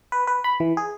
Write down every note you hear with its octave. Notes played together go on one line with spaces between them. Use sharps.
B4
B4
B5
E3
G#4